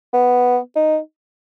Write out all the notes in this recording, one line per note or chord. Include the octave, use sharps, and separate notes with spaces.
B3
D#4